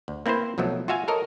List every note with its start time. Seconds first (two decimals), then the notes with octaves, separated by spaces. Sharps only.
0.08 D2
0.26 A#3 C4 E4 B4 C5
0.58 B1 F3 F#3 A3
0.88 F4 F#4 E5 F5 G#5
1.08 A4 A#4 C#5 D#5